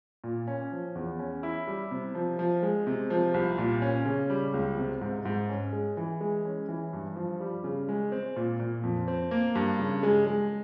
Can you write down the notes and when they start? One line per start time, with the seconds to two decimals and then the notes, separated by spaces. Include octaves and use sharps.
0.24 A#2
0.47 C#4
0.72 F3
0.95 E2
1.19 C#4
1.43 E4
1.67 G3
1.91 C3
2.15 F3
2.39 F3
2.63 G#3
2.87 C3
3.10 F3
3.34 C2
3.58 A#2
3.82 C#4
4.05 C#3
4.30 G3
4.54 C#2
4.78 C3
5.01 G#2
5.25 G#2
5.49 C#4
5.73 G#3
5.97 E3
6.21 G#3
6.45 C#4
6.68 E3
6.93 G2
7.16 F3
7.40 G3
7.64 C#3
7.89 G#3
8.12 C4
8.36 A#2
8.60 A#2
8.83 F2
9.08 C4
9.31 A#3
9.55 G2
9.79 C#3
10.03 G#3
10.27 G#3